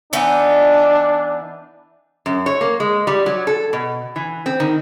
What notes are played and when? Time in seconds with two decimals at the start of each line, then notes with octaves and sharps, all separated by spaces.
0.13 E3 B3 D4 D#4
2.26 F#2
2.46 C#5
2.61 A#3
2.80 G#3
3.07 G3
3.26 F#3
3.47 A4
3.73 B2
4.16 E3
4.46 C4
4.60 D#3